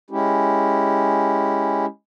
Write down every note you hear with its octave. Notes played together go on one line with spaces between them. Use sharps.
G#3 C#4 E4 G4